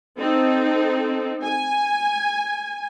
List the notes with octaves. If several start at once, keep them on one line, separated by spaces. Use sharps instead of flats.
C4 D#4 A4
G#5